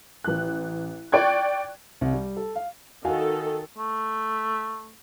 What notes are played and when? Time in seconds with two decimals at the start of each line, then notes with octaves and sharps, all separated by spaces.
0.24 A1 F#6
1.12 D5 G5 C#6 F#6 G#6
2.01 C2
2.13 G3
2.37 A4
2.55 F5
3.05 D#3 F#4 A4 F5 G#5
3.77 A3